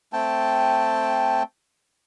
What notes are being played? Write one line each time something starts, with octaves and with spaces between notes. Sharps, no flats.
A3 C4 G5 A5